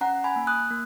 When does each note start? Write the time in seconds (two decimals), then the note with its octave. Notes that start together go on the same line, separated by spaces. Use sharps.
0.01 C#4 F#5 A#5
0.24 G#5 B5
0.36 A#3
0.47 D#6 F#6
0.70 A#3